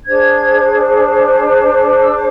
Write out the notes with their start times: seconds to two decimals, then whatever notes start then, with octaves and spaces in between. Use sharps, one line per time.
0.06 D4 G#4 C5 G#6
2.02 E6
2.14 D6